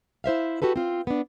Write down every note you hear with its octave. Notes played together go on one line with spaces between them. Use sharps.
E4 C5 E5 F5
F#4 G4 A4 B4
C4 F4
B3 D4